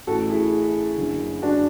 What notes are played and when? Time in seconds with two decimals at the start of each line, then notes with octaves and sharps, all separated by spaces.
0.07 A1 A2 E3 F#4 A4
0.30 E4 G#4
0.98 F#1 F#2 D3 F#3
1.42 D4 F#4